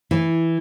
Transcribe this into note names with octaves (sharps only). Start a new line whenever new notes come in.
E3